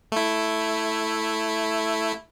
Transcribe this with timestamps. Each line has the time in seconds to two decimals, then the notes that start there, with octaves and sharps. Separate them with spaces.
0.12 A3 E4